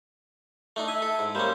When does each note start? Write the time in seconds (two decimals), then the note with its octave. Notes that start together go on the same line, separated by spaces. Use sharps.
0.76 A3 D4 D#4
0.88 E5 G#5
1.02 A4
1.19 G#2
1.35 G3 A#3 C#4 C5